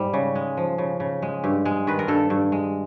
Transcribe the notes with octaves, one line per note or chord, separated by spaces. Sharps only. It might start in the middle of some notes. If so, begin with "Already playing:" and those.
Already playing: G#2 G3
C#3
G#3
F3
C#3
C#3
G#3
G2 G4
G#3
D#3 B4
A#4
G2 A4
G2
G#3